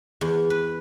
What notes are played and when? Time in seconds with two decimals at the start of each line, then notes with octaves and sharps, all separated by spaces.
0.21 E2
0.50 B4